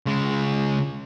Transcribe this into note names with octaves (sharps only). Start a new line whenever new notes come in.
C#3 G#3